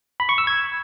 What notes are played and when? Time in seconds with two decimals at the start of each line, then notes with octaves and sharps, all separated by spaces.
0.20 B5
0.29 C#6
0.38 E6
0.47 G#6